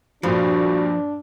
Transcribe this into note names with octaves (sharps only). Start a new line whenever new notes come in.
G2 A#2 F3 D4 F#4